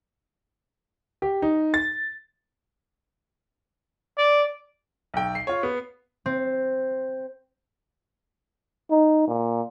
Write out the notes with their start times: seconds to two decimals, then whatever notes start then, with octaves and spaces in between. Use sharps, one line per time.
1.22 G4
1.42 D#4
1.74 A6
4.18 D5
5.14 B1 G5
5.35 C7
5.47 F4 C#5
5.63 B3
6.26 C4
8.90 D#4
9.27 A#2